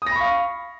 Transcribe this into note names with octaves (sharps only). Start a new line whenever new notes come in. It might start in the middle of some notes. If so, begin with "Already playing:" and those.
F5 B5 C#6 D#6 A#6